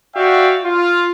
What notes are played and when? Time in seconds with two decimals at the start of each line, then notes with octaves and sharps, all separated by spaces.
0.14 F#4 D5 E5 F5 G5
0.63 F4